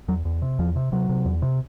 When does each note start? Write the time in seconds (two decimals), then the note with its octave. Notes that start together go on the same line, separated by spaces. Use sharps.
0.08 E2 F#3
0.25 E2
0.42 C3
0.59 E2 F3
0.76 C3
0.92 C3 F#3
1.09 C3
1.26 E2
1.42 C3